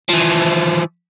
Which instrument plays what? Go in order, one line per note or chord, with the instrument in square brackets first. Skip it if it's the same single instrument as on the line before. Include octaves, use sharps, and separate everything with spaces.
[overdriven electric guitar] E3 F3